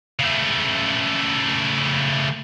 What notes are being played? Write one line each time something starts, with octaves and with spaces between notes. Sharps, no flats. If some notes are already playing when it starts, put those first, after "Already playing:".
C#3 A3